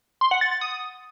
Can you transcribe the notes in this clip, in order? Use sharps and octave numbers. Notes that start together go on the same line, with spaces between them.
C6
F#5
A6
A6
D#6